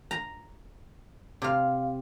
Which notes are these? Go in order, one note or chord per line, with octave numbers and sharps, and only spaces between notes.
A#5
C3 F5